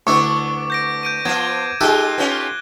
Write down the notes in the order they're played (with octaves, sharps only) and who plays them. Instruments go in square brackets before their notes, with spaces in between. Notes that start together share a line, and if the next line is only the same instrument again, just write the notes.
[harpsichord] D2 E4 [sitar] B3 D4 [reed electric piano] C#6 [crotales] D6
[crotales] G6 A#6 D7
G6 D7 D#7
[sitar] F3 F4 [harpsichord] B3 [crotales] G#6 E7
[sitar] G#3 F4 [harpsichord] D#4 G4 A4 [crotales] F#6 G7
[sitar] B3 C#4 F4